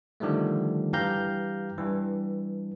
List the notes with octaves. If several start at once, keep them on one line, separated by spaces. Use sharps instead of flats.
D3 D#3 F3 G3 A3
G2 E3 G4 F5 A#5 G6
G2 E3